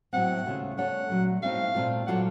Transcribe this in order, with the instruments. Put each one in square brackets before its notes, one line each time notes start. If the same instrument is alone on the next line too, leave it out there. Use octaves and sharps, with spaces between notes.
[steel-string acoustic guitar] A2 F#3 C4 [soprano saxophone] F#5
[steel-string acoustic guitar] D#2 C#3 A3 C#4 F4
[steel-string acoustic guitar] A3 C#4 A4 C#5 [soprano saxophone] F#5
[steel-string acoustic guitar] A#2 F#3 A3
[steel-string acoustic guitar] A2 A3 C4 D#4 [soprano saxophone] F5
[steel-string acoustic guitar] A#2 A3 C4 F4
[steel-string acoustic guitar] A#2 F#3 A#3 F4 A4 [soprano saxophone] F#5